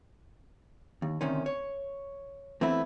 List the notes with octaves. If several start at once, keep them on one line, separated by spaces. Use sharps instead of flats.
D#2
D2 C3 D#3 C#4
C#5
E3 A3 B3 C4 E4